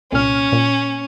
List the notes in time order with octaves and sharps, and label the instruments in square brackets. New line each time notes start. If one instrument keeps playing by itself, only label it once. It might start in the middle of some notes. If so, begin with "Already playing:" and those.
[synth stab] C2 A#2 F6 [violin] C#4
[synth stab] A#2